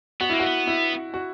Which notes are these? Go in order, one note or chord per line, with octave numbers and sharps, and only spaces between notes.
B3 F#4
A#3 E4
B3 F#4
E4
F#4